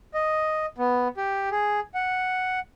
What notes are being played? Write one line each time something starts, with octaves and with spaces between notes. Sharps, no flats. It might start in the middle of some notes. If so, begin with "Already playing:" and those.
D#5
B3
G4
G#4
F#5